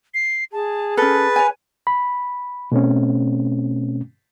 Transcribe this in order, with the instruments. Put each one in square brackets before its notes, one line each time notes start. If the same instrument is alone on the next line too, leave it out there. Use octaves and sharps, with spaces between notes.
[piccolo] C7
[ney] G#4 [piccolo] A5
[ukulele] C#4 A4 [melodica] B4 [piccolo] A6
[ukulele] C#5 G#5
[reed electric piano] B5
B2 A3 C4 C#4